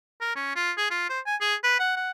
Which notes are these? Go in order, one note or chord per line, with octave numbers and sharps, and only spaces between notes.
A#4
C#4
F4
G#4
F4
C5
G#5
G#4
B4
F#5
F#5